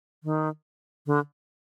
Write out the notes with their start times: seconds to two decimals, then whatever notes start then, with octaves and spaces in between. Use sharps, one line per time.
0.24 D#3
1.07 D3